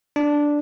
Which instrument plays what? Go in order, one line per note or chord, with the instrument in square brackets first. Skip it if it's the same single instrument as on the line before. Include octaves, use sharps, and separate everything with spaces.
[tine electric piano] D4